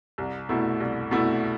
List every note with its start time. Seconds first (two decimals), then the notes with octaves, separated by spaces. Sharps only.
0.18 C2
0.49 B2 A3 E4
0.80 C2
1.11 B2 A3 E4